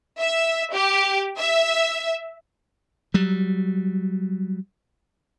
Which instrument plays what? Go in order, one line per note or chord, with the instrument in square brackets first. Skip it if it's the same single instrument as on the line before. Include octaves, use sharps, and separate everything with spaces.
[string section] E5
G4
E5
[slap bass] F#3 G3